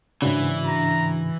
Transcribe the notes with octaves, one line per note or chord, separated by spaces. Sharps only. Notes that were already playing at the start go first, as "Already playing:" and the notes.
G#2 C#3 E3 D4 F#4
A#5